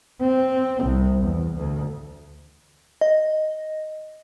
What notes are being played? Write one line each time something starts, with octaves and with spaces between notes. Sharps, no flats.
C4
C2
E2
D2
D#5